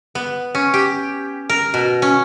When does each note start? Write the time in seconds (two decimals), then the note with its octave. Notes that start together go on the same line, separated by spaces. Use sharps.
0.15 B3
0.55 C#4
0.74 G4
1.49 A#4
1.74 B2
2.02 C#4